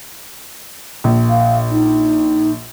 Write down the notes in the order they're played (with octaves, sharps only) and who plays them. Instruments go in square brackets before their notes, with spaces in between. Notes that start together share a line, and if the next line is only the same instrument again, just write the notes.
[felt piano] A#1
[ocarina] F5
D#4